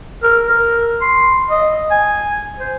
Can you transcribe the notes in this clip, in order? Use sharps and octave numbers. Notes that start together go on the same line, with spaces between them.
A#4
A#4
C6
D#5
G#5
C5